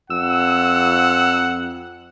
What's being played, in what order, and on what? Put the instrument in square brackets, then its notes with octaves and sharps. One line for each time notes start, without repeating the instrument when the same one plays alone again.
[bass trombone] F2 [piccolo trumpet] F#5 [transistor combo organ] E6